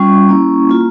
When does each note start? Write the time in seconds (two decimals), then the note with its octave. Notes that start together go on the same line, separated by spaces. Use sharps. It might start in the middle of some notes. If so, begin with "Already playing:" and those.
Already playing: G3 C#4 F4 C#6
0.29 A#3 C#4 E4
0.69 A#3 F4